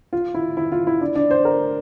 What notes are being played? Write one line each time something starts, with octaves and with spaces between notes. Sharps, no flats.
F4
E4
E4
F4
E4
D4
D4
C5
A#4